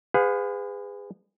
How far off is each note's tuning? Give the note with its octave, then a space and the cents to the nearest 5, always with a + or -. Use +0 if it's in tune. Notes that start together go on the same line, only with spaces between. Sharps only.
G#4 -25 B4 +35 F5 +45